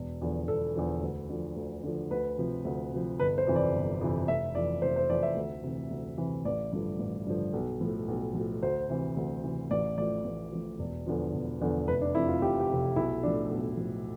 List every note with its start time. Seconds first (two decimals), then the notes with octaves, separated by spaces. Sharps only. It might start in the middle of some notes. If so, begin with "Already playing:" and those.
Already playing: E1
0.21 E2 D3 F3
0.48 E1 A4
0.76 E2 D3 F3
1.02 D2
1.29 D3 F3
1.57 D2
1.83 D3 F3
2.11 D2 B4
2.38 C3 F3
2.65 D2
2.92 C3 F3
3.19 G1 B4
3.38 C5
3.47 F2 C3 E3
3.56 D5
3.74 G1
4.01 F2 C3 E3
4.28 F1 E5
4.55 F2 E3 D5
4.82 F1 C5
4.96 C5
5.09 F2 E3 D5
5.23 E5
5.37 D2
5.63 C3 E3
5.91 D2
6.18 C3 E3
6.45 A1 D5
6.72 G2 D3 F3
6.99 A1
7.26 G2 D3 F3
7.53 B1
7.81 A2 F3
8.08 B1
8.35 A2 F3
8.63 D2 C5
8.90 C3 E3
9.17 D2
9.44 C3 E3
9.71 A1 D5
9.98 A2 F3 D5
10.25 A1
10.52 A2 F3
10.79 E1
11.06 E2 D3 F3
11.34 E1
11.60 E2 D3 F3
11.88 F1 B4
12.02 D4
12.15 F2 C3 E4
12.28 F4
12.41 F1 G4
12.60 G4
12.69 F2 C3
12.96 B1 E4
13.23 A2 F3 D4
13.51 B1
13.78 A2 F3